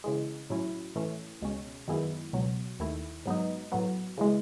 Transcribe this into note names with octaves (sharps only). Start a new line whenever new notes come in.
C#3 E3 G#3
A2 F#3 C#4 E4
A2 E3 A3 C#4
C#2 B2 G#3 C#4
F#2 D#3 G#3 B3 E4
C#2 B2 F#3
D#2 D#3 A3 E4
G#2 F#3 B3 D#4
A2 F#3 B3
C#3 E3 G#3